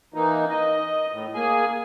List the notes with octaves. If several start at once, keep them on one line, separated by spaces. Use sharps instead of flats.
E3 A#3 D#4
D#5
A2
A#3 G#4 G#5